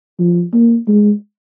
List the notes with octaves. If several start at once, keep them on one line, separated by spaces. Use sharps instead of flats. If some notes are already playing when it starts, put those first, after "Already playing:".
F3
A#3
G#3